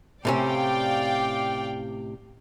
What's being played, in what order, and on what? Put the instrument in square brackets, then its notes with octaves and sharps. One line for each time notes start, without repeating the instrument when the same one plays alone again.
[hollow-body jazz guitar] A2 C3 C#4 [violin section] D5 F5 G5